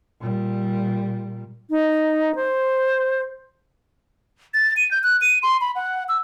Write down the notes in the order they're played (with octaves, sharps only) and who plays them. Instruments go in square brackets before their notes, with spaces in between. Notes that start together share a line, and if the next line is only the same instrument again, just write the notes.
[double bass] A#2 G3
[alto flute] D#4
C5
[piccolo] A6
D#7
G6
F#6
D#7
C6
B5
F#5
E6